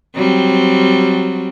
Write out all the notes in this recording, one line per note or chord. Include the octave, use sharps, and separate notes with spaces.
F#3 G3 C4